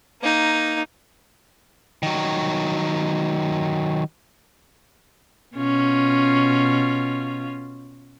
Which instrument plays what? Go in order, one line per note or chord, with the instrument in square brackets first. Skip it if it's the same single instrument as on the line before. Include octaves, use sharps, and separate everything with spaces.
[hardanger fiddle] A#3 D#4
[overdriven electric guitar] D#3 F#3
[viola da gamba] B2 C#4 F4